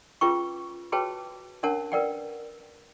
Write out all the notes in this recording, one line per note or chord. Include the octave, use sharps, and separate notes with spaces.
C#4 F4 G#4 B4 G5 C#6
F#4 G#4 B4 C#5 G5 A5
C#4 D4 A#4 C#5 F#5 A5
A#4 B4 D5 F#5 G5